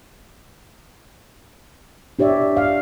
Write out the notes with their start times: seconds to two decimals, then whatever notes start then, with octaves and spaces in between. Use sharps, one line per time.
2.19 D4 G4 C#5 D5 E5
2.57 F5